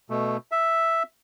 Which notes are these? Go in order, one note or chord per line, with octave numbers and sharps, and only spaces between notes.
B2 A3
E5